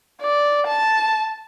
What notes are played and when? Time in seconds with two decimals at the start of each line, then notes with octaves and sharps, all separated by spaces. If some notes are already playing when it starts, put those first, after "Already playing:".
0.22 D5
0.67 A5